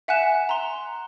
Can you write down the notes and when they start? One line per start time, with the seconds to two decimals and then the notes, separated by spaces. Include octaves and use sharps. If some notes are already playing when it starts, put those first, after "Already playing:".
0.08 E5 F#5 G#5 F#6 E7
0.49 A#5 C6